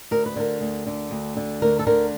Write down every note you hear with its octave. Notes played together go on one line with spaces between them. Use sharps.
D2 A#4
B4
D3 A#4
D2
D3
D2
D3
D2 A#4
A4
D3 A#4